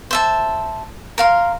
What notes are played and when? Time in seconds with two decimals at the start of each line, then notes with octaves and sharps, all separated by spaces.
0.11 C5 E5 A5
1.18 A#4 F5 C6